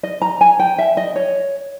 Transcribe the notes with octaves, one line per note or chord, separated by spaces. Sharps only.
D#5
A#5
G#5
G5
E5
D#5
C#5